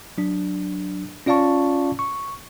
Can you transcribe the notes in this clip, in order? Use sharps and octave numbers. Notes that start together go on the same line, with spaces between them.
F#3 D4
C#4 F4 D5 F5 A5 C#6
C#6